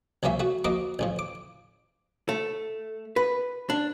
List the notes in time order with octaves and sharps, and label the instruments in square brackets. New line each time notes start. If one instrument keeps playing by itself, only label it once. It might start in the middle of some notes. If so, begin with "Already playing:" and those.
[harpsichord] C2 F3 A#3 C#4 E5
A3 F#4
F3 A#3 F#4 D#5 D6
A1 A2 F3
D6
[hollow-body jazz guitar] A3
B4
D4